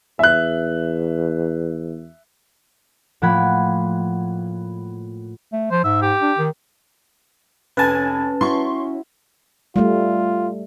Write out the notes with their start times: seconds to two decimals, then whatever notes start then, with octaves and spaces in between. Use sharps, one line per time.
0.19 E2 E5 F#6
3.22 A2 F3 A#3 F#5 B5 G#6
5.53 A3
5.71 F3 C5
5.84 G#2 E5
6.02 G4
6.22 D4
6.38 D#3
7.77 F1 C#4 B4 G#5 A5
8.41 E4 F#4 C6 C#6
9.76 G3 A3 F4